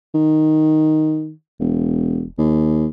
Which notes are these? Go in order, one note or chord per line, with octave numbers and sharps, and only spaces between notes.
D#3
E1
D#2